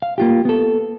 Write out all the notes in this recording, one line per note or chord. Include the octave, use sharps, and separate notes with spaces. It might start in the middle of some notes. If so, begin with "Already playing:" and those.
F5
A#3 F4 G4
B3 A4